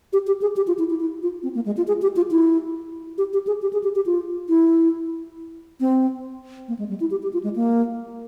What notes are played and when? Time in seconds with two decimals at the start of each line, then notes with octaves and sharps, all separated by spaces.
0.13 G4
0.27 G4
0.42 G#4
0.57 G4
0.67 F4
0.79 E4
0.90 E4
1.00 E4
1.23 F4
1.43 C4
1.55 A#3
1.66 G#3
1.77 F4
1.88 G#4
2.02 G4
2.16 F4
2.31 E4
3.18 G4
3.33 G4
3.47 G#4
3.62 G4
3.73 G#4
3.84 G4
3.95 G4
4.06 F4
4.49 E4
5.80 C4
6.68 A#3
6.79 G#3
6.89 G3
7.00 E4
7.11 G4
7.23 G4
7.33 F4
7.44 G#3
7.56 A#3